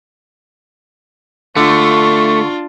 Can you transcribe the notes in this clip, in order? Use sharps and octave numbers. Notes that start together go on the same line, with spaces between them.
D3 A3 D4 F4 C#6